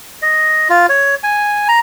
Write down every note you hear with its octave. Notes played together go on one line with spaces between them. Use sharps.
D#5
F4
C#5
G#5
A#5